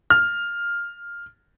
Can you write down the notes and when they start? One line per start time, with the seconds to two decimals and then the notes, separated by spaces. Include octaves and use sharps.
0.10 F6